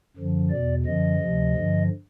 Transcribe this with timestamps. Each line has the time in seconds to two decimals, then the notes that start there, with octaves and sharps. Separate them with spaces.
0.17 F#2 D3 F3
0.51 E2 B2 D5
0.85 F#2 D3 F3 D#5
1.20 D2 C3 F3
1.55 G2 D3 F3